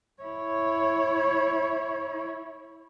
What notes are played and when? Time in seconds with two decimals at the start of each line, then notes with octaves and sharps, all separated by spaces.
0.22 E4 C#5